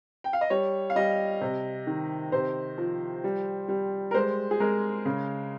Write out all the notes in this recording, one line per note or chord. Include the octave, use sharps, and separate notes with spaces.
G5
F5
D#5
G3 C#5
F5
G3 D#5
C3
D#3
C3 C5
F3
G3
G3
A#4
G#3 C5
G#4
G#3 A#4
C#3